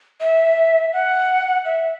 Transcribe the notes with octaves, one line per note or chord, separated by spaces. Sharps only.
E5
F#5
E5